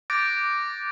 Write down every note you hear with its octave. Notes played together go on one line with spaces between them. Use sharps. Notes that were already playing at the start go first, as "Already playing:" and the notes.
D6 F#6 G6 A6 A#6 D7